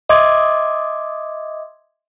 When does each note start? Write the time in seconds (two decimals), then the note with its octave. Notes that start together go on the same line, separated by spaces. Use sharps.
0.09 D#5 E5 C6 D6 D#6 G#6